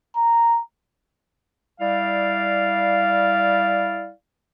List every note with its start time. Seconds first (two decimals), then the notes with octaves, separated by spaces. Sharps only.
0.16 A#5
1.81 G3 E4 D5 F5